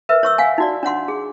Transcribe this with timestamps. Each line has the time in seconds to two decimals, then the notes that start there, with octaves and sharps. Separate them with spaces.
0.09 A#4 B4 E5
0.23 C#5 C#6 E6
0.38 F5 F#5 G#5
0.58 D#4 F#4 D5
0.83 D4 C#5 F#5 C6
1.08 G#4